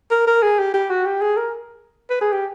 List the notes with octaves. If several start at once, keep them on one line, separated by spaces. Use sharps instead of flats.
A#4
A#4
G#4
G4
G4
F#4
G4
G#4
A#4
B4
G#4
G4